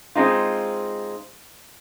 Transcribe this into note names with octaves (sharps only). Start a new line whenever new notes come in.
G#3 C4 D#4 F4